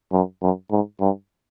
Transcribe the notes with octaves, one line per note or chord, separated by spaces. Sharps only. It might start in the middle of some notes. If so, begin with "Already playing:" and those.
F#2
F#2
G#2
G2